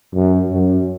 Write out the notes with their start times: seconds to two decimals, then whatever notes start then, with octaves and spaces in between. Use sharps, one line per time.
0.14 F#2
0.52 F#2